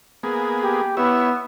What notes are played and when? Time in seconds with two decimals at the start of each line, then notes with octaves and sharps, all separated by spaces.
0.23 A#3 B3 G#4
0.64 G4
0.97 B3 E4 C#5 E5